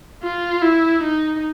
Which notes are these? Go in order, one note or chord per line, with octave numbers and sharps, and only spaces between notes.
F4
E4
D#4